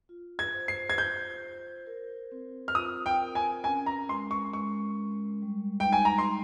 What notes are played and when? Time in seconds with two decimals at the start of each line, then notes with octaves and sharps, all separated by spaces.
0.09 F4
0.39 G#6
0.53 C5
0.68 C7
0.90 G#6
0.98 C5 G6
1.43 C5
1.87 A#4
2.32 C4
2.68 F6
2.75 F4 D#6
3.06 G5
3.20 A#4
3.35 G#5
3.64 C#4 G#5
3.86 A#5
4.09 G#3 C6
4.31 C#6
4.53 G#3 C#6
4.97 G#3
5.42 G3
5.80 G5
5.86 D#4
5.93 G#5
6.05 A#5
6.18 C6